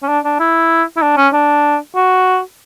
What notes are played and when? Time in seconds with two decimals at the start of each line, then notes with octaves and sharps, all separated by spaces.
0.03 C#4
0.08 D4
0.25 D4
0.40 E4
0.97 E4
1.02 D4
1.17 C#4
1.33 D4
1.96 F#4